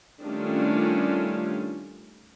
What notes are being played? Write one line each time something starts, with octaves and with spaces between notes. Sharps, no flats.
D#3 G3 A3 C#4 D4 F4